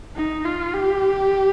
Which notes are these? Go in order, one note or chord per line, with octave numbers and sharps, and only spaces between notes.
D#4
F4
G4